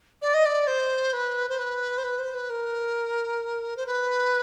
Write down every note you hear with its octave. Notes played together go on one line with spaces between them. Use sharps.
D5
D#5
D5
C5
B4
C5
B4
C5
B4
C5
B4
A#4
C5
B4